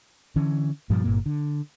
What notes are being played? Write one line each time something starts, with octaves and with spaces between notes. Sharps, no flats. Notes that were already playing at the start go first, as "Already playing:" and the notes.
D3 E3 C#4
G2 A#2 F3 G3
G1 G2 A#2 A#3
D3